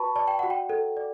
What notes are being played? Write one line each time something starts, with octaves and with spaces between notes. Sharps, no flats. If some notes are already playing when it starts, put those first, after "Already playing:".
Already playing: F#4 B4 A5 B5 C#6
D5 A5
G5
F#4 F#5
G5
A4
D5